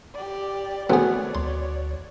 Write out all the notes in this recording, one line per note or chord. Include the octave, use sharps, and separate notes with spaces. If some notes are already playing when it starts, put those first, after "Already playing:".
G4 D5
B2 A3 B3 C4 G#4 C#5 D5
D2 C6